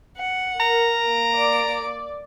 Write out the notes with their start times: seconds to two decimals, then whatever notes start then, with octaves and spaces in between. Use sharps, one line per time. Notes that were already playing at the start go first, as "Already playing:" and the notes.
0.17 F#5
0.60 A#4 A#5
1.04 A#3 D7
1.34 D5